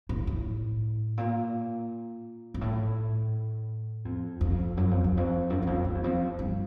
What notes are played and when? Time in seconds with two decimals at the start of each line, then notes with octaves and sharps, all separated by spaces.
0.09 A2
0.27 A2
1.18 A#2
2.54 G#2
2.61 A2
4.05 F2
4.41 F2
4.77 F#2
4.91 F2
5.04 E2
5.17 F2
5.50 F#2
5.62 E2
5.67 F2
5.85 F#2
5.95 E2
6.04 F2
6.39 G2